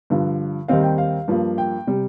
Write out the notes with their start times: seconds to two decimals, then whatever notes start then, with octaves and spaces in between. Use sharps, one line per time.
0.10 G2 D3 F3
0.68 D#2 D#3 G3 C4 D#4 F5
0.83 G5
0.98 F5
1.28 G2 F3 A#3
1.58 G5
1.87 C3 G3